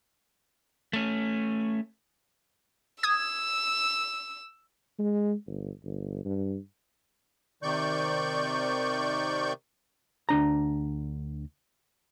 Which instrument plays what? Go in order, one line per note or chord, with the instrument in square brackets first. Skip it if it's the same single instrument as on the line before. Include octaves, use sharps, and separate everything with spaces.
[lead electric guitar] A3 C#4
[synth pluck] D#6 G#6 [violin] E6
[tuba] G#3
G1
G1
G2
[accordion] C3 D#3 D5 C#6 G6
[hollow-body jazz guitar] D2 D4 A#5